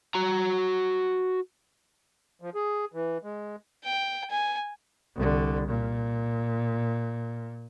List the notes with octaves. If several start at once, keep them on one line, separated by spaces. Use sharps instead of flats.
F#4 A#5
F3
G#4
E3
G#3
G5
G#5
C2 D3
A#2